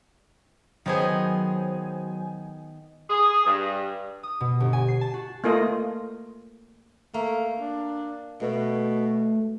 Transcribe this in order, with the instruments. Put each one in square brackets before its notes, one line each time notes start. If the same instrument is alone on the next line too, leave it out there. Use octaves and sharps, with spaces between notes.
[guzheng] D#3 B3 G#4 [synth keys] F#3 C5 G#5
[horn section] G#4
G2
[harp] D#6
B2
G1
G#5
C7
A5
F#4
[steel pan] A3 A#3 F4 D#5
[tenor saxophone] A3 [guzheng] A#3
[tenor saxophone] D4
[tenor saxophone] B2 [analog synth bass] A3